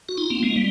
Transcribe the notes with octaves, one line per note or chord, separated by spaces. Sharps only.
F#4
D#4 F4
A#3 C4
G#3 A#3
G3